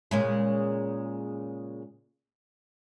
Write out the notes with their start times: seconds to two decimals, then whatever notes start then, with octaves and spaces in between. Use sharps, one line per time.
0.11 A#2 C#3 G#3